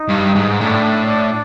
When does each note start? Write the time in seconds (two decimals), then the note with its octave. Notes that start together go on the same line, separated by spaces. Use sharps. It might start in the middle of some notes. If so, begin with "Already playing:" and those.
Already playing: D#4
0.09 G2
0.36 G#2
0.61 A2 D4